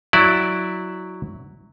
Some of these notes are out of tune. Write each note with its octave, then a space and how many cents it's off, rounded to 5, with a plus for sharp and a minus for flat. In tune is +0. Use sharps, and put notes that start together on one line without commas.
F#3 +0 E4 -5 D5 +0